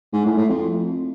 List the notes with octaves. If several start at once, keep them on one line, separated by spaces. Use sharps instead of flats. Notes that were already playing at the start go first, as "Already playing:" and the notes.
G#2
A2
A2
F2